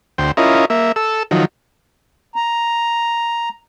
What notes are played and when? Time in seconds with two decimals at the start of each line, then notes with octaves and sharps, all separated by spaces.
0.18 D2 C5 G5
0.37 C#4 E4 F4 A#4 D#5
0.70 A#3 E5
0.96 A4 E6
1.31 D#3 F3 F#3
2.36 A#5